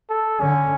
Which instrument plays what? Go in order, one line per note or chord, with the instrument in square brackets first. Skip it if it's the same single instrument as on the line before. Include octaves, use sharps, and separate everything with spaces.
[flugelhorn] A4
[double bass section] D3 [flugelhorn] C#4